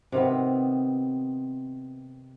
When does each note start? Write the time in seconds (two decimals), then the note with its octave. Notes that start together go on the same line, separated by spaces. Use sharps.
0.12 C3 D#3 B3